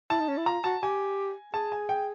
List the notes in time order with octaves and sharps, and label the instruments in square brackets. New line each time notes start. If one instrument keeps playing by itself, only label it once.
[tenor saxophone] E4 [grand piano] A5
[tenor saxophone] D#4
C#4
E4
[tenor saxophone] F4 [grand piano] A#5
[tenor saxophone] F#4 [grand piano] A5
[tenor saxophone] G4 [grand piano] G#5
[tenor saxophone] G#4 [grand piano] A5
[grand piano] G#5
G5